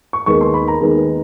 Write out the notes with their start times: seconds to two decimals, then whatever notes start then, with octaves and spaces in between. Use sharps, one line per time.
0.13 C#6
0.26 D#2 D#3 G#3 B3 D#4 C#6
0.41 C6
0.54 B5
0.68 A#5
0.81 D#2 D#3 G#3 B3 D#4